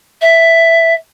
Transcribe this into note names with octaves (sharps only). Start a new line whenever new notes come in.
E5